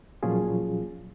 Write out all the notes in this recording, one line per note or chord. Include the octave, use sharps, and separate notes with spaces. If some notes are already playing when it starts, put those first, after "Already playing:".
A#2 F3 F#3 C#4 F4 G#4